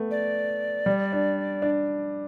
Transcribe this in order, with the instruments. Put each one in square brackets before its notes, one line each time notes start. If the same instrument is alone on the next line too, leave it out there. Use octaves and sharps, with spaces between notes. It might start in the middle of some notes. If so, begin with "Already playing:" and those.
Already playing: [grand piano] A3 B3
[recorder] D5
[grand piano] G3
D4
D4